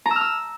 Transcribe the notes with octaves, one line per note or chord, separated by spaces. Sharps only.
A#5
E6
F6
E6